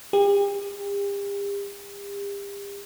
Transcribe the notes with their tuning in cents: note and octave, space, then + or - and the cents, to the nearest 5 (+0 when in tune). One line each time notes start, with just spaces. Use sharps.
G4 +40